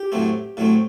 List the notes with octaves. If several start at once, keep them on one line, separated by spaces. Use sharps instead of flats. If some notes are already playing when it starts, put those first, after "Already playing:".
Already playing: G4
A2 F#3 A3 C4
A2 F#3 A3 C4